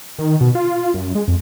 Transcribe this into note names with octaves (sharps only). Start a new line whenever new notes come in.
D#3
B2
F4
F#2
G#3
F2